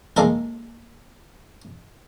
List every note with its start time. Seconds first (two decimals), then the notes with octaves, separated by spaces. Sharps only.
0.17 G#3 A#3 D#4 A4 A#4